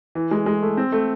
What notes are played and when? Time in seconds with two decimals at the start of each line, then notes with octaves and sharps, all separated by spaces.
0.15 E3
0.31 G#3
0.46 G#3
0.62 A3
0.77 C4
0.92 A3